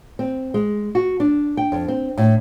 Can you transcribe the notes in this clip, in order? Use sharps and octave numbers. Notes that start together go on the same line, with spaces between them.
C4
G#3
F#4
D4
G5
F2
C4
A2